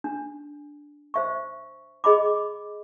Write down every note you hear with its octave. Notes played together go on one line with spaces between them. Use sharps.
D4
C5 E5 C#6
G#4 D#5 A#5 B5 D6